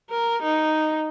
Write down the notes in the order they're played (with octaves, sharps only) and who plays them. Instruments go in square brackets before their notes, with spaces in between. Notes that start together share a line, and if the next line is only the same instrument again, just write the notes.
[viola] A#4
D#4